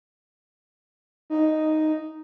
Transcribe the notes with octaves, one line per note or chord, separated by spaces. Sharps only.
D#4